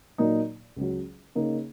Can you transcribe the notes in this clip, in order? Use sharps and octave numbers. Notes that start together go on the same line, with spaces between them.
A#2 F#3 A#3 D#4
C#2 C#3 F#3
C#3 A#3 D#4